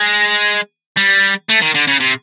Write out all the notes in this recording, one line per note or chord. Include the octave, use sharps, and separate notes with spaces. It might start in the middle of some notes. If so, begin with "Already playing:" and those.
Already playing: G#3
G3
A3
D#3
D3
C#3
C3